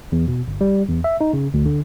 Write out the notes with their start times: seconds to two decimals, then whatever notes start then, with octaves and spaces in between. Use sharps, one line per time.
0.12 E2
0.28 B2
0.48 G1
0.61 G3
0.89 E2
1.04 E5
1.21 D#4
1.33 C#3
1.54 D2
1.66 D3